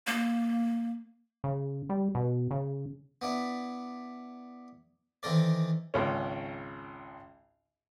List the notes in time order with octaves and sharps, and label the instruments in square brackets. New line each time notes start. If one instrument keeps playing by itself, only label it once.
[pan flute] A#3
[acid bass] C#3
G3
B2
C#3
[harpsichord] B3 D4 E4
D#3 E3 C4 A4 A#4 D5
[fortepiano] G#1 C#2 C#4